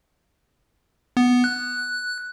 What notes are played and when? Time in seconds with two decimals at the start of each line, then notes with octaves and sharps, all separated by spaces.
1.17 B3
1.44 F#6